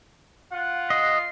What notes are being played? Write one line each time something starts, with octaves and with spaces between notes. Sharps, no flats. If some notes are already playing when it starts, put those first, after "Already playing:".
F4 F#5
D#5 C7